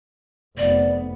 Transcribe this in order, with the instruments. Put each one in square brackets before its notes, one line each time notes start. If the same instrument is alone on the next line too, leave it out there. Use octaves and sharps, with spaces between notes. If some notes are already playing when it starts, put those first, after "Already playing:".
[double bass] F1 B3 [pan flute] D5